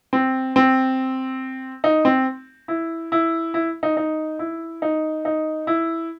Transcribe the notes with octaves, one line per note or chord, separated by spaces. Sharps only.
C4
C4
D#4
C4
E4
E4
E4
D#4
D#4
E4
D#4
D#4
E4